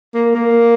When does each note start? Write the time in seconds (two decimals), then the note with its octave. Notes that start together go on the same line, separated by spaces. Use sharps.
0.14 A#3
0.35 A#3